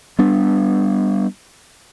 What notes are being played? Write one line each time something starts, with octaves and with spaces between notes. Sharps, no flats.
G3 B3 D4